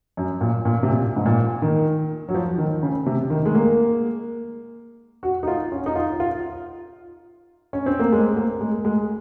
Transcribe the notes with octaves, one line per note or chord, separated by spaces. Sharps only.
F#2
A#2
A#2
C3
A#2
G#2
A#2
D#3
F#3
F3
D#3
C#3
C3
D#3
G#3
A#3
F#4
D#4
F4
C#4
D#4
F4
F4
C#4
C4
A#3
G#3
A#3
G#3
G#3